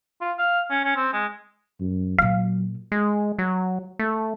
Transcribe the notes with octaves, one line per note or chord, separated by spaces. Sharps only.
F4
F5
C#4
C#4
C4
G#3
F#2
A#2 F#3 A#3 F5
G#3
F#3
A3